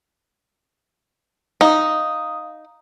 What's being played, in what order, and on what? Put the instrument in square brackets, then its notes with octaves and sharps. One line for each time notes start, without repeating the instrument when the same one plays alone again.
[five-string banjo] D#4 [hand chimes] F5 D#6